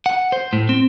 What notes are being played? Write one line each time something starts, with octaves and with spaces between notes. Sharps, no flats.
F#5
C5
A2
C4